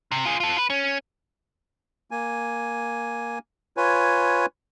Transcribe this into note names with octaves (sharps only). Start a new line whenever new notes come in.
C3
F4 G#4
F4 A4
B4
C#4
A#3 G#5
F4 B4 C#5 G#5